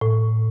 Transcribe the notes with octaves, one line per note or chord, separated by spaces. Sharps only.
A2